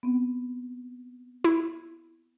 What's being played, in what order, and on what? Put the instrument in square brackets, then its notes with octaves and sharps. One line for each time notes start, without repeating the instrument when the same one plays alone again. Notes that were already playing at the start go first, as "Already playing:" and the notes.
[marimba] B3 C4
[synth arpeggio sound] E4